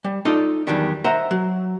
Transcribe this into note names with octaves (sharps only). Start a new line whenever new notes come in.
G3
D#4 F4 A4 D5 D#5
E2 G#2 D#3 F#3 G3 D4
C5 D#5 E5 F#5 A#5
F#3